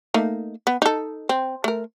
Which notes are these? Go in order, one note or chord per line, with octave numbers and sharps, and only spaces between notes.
A3 A#3 D#4
B3
D#4 A4
C4
A3 A#4